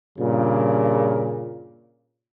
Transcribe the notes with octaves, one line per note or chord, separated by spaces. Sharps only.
G2 A#2 C#3